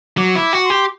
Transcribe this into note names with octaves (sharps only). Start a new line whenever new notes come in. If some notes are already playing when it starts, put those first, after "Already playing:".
F#3 D6
E4
D6
F#4
C6
G4